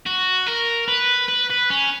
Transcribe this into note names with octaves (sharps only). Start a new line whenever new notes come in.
F#4
A#4
B4
B4
B4
C#4